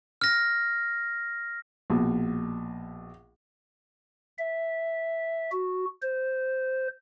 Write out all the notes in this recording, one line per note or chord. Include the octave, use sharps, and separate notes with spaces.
F6 A#6
A#1 B2
E5
F#4
C5